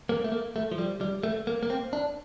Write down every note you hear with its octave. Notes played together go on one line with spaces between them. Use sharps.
A#3
A3
A#3
A3
F3
G3
G3
A3
A#3
A#3
C4
D4